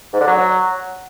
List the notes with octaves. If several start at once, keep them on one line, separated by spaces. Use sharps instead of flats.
G#2
D3
F#3